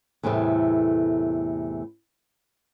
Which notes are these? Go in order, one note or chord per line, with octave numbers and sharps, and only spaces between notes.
E2 A2 C3 G3 A3 B3